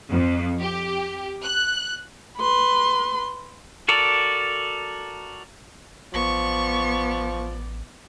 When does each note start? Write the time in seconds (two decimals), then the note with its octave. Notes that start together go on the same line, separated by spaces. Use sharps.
0.10 F2
0.60 G4
1.43 F#6
2.38 B4 C6
3.88 F#4 A4 A#4 D5
6.14 A1 F3 B3 D5 C#6